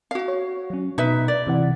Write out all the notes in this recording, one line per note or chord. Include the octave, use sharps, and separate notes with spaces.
F#4 F5
C#5
F#3 C#4
B2 D#4 B4 E5
D5
C3 E3 F#5